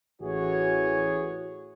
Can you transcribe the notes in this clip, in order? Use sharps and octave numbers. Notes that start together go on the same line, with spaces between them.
A1 E3 F#4 G#4 C#5